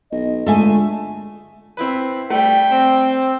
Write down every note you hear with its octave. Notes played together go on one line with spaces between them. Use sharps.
B1 D#5
D3 G#3 A3 F4 A4 E5 G#5
C4 E4 B4
G3 A3 G5
C4